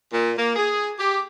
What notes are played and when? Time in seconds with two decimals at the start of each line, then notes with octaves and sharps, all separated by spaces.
0.12 A#2
0.37 A#3
0.55 G#4
0.98 G4